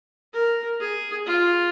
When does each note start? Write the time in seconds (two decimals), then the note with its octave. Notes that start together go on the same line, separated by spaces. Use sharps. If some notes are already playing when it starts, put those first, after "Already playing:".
0.33 A#4
0.80 G#4
1.26 F4